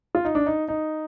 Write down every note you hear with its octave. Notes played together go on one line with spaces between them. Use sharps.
F4
D#4
D4
D#4
D#4